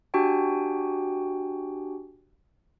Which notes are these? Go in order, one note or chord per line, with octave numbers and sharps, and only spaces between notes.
D4 F#4 G4 G5 G#5